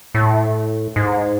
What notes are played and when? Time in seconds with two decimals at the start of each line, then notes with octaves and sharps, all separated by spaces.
0.15 A2
0.96 G#2